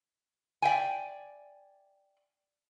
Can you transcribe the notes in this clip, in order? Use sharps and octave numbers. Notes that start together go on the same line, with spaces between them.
D5 E5 G5 G#5